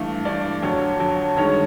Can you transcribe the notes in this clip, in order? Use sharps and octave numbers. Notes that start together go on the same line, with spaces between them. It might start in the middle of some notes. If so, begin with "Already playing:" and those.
Already playing: G2 E3 A3 F5
G2 E3 A3 D5
F2 D3 F#3 C#5
F2 D3 F#3
G2 D#3 G#3 C#5